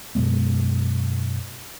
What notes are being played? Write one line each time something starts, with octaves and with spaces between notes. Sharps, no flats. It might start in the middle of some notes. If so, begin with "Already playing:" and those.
F#2 B2 G#3 B3